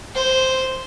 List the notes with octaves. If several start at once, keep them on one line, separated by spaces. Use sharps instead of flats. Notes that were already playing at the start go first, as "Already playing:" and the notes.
C5